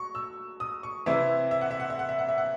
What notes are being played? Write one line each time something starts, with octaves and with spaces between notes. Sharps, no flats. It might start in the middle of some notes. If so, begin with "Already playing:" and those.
Already playing: F#3 C#6
E6
D#6
C#6
C3 E3 C4 E4 E5
E5
F#5
E5
F#5
E5
F#5
E5
F#5
E5
F#5